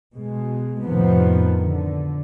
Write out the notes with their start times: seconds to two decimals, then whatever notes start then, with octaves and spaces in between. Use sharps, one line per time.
0.15 B2 G#3
0.83 F2 A2 C3 D#3 F3 B3
1.60 D3